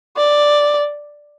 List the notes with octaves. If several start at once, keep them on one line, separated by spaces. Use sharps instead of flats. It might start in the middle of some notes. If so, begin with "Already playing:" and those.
D5